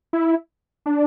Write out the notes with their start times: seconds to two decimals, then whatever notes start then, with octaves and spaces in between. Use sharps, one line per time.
0.13 E4
0.86 D4